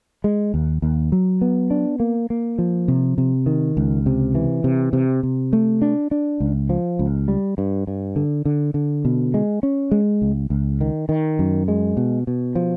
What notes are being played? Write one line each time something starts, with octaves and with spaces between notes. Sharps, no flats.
G#3
D#2
D#2
F#3
B3
D4
A#3
A#3
F3
C3
C3
D#3
C#2
C3
E3
C3
C3
C3
A3
D4
D4
C#2
F3
C#2
G3
G2
G2
D3
D3
D3
B2
G#3
C#4
G#3
C#2
C#2
D#3
D#3
F#2
G#3
B2
B2
F3